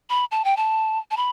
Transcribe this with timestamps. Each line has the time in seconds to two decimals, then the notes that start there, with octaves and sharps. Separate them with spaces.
0.10 B5
0.32 A5
0.45 G5
0.57 A5
1.11 A5
1.17 B5